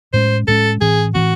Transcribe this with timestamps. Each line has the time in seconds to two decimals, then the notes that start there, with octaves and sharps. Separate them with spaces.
0.13 A2 G#3 C#4 C5
0.48 A2 G#3 C#4 A4
0.81 A2 E3 C4 G#4
1.15 A2 E3 C4 F#4